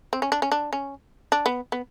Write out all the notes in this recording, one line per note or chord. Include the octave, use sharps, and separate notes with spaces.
C4
C#4
D4
C#4
D4
C#4
D4
B3
B3